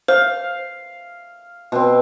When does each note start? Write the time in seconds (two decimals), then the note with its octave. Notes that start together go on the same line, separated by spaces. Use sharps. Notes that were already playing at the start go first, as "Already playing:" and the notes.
0.08 C5 F5
1.72 B2 C4